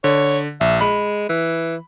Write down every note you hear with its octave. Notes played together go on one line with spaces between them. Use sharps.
D3 C#5
A#1 E5
G#3 B5
E3